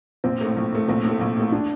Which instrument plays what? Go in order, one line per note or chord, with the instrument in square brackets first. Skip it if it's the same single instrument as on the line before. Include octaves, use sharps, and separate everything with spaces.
[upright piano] A#1 [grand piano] C4
[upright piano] A2 A3
A#1
A2 A3
[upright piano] A#1 [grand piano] C4
[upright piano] A2 A3
A#1
A2 A3
[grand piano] D4